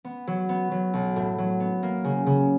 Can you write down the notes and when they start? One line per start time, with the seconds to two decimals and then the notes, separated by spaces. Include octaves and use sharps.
0.04 B3
0.27 F#3
0.49 B3
0.71 F#3
0.93 B1
1.16 A2
1.38 F#3
1.60 B3
1.83 A#3
2.04 C#3
2.26 C#3